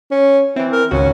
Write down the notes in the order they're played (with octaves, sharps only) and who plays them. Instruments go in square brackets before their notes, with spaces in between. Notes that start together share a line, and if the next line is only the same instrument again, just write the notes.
[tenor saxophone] C#4
[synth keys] E3 C4 [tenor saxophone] E4
[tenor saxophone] A#4
[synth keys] G#1 C#2 F#4 [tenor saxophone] C#4